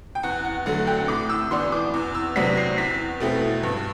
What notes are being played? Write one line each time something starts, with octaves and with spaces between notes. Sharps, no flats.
G5
E2 F#5
F#5
D3 F#3 A3 F#5
G5
A2 D6
E6
E3 B3 D4 C6
D6
E2
E6
C3 F#3 B3 D4 B6
C7
E2 B6
B2 A3 C4 E4
G2